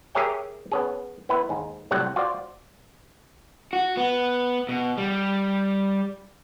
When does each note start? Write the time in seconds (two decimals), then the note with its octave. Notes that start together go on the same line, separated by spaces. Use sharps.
0.15 G4 G#4 A#4 C#5 E5 G5
0.72 B3 C#4 G#4
1.29 B3 E4 B4
1.49 D#2 G#2
1.91 A2 C3 F#3 G3 F#4 F#5
2.16 F4 F#4 C5 D5
3.73 F#4
3.97 B3
4.69 B2
4.98 G3